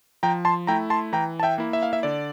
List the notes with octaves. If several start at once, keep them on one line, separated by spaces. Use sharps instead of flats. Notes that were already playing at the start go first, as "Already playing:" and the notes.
F3 G5 A#5
A5 C6
A3 E4 G5 A#5
A5 C6
E3 G5 A#5
A5
E5 G5
A#3 E4
E5
F5
E5
D3 D5